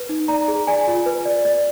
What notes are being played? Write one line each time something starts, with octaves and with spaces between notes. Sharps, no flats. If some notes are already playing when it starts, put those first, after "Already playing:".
Already playing: B4
D#4
D5 A#5
G#4
D5 G#5
F4
B4
D5
D5